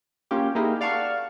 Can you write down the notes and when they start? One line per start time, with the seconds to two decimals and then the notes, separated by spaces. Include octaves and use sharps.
0.31 A#3 C#4 F4 G4
0.55 A#3 D#4 E4 G4 G#4 A#4
0.81 D5 F5 F#5 A5 C#6